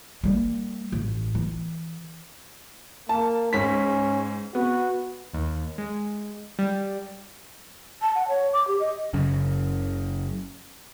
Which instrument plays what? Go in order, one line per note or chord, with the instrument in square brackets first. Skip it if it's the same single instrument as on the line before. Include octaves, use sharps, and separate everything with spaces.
[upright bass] G3 A#3
A1
E3
[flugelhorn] A#3 [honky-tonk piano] A5
[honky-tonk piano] G#2 B6 [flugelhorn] C#4
[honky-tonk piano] B3 [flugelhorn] F#4
[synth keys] D#2
G#3
G3
[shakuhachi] A5
F#5
C#5
D6
G4
D#5
[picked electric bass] F#1 F#2 C#3